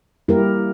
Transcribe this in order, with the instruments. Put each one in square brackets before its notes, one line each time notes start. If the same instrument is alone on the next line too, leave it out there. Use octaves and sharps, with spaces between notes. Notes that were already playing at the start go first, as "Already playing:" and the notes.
[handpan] G3 A#3 E4 G4 A#4